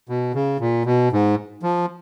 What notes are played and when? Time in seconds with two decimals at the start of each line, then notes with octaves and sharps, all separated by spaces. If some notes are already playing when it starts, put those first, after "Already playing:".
0.09 B2
0.34 C#3
0.60 A#2
0.86 B2
1.12 G#2
1.63 F3